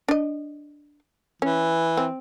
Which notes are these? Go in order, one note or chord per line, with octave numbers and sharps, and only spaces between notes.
D4 D#5
E3 C#4
C4